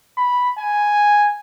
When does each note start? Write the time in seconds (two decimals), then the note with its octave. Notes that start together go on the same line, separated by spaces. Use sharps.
0.18 B5
0.58 G#5